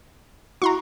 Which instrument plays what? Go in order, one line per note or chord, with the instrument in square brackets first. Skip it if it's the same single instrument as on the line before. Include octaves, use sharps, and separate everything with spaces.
[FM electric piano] E4 F#4 [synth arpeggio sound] A#5 C6 C#6